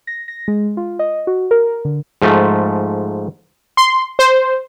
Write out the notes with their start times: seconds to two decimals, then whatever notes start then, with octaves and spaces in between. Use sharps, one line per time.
0.07 A#6
0.28 A#6
0.48 G#3
0.77 F4
0.99 D#5
1.27 F#4
1.51 A#4
1.85 D3
2.22 G#2 F3 A3
3.77 C6
4.19 C5